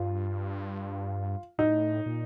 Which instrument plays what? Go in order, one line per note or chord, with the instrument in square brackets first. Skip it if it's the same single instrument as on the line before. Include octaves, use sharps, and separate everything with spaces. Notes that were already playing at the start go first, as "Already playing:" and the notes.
Already playing: [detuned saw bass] G2 [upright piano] F4
[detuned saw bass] A2 [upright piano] D#4
[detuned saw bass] A#2